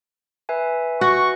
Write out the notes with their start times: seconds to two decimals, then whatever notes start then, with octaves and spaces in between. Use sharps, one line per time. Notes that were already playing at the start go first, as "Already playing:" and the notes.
0.49 B4 E5 G#5
1.01 F#4 C#6